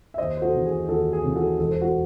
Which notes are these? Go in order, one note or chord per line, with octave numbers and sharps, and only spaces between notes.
E5
D#2 C5 D#5
C5
F#4 A4
C#3 E3
G#4
D#2 F#4 A4
G#4
C#3 E3
F#4 A4
E1 A4
C5
F#4 A4